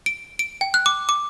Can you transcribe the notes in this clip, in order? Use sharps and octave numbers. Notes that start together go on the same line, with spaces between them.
D7
D7
G5
F#6
D6
D6